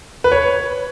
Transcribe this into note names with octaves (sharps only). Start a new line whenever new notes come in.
B4
C#5